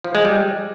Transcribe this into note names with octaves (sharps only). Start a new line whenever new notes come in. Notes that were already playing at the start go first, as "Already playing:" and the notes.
F3
G#3
G3